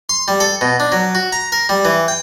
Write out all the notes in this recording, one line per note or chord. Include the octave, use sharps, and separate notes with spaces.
C6
G3
A4
B2
D4
F#3
F#4
A#5
A#4
G3
E3
G5